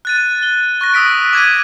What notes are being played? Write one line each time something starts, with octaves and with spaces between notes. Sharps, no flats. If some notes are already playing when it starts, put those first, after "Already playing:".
F#6 A6 D#7
G7
C#6 F#6 A#6
D#6 E6 B6 D7
D6 G#6 A#6 D#7